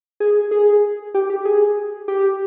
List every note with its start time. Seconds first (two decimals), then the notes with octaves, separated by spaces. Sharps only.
0.20 G#4
0.51 G#4
1.14 G4
1.30 G4
1.45 G#4
2.08 G4